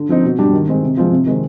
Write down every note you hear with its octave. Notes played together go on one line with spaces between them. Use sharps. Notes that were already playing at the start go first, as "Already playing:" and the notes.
Already playing: D3
F3 C4 D#4
B2
G3 D4 G4
D#3
G#3 C4
C3
F3 G#3 C4 F4
C3
D#3 G#3 C4